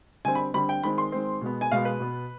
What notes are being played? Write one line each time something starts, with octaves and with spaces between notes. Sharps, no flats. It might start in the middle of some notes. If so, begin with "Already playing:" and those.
D3 G3 C4 G#5
B5
D3 G3 C4 B5
G5
D#3 G#3 C4 B5
C6
D#3 G#3 C4
B2 G#3 B3
G#5
B2 G#3 B3 F5
B4
B2 B3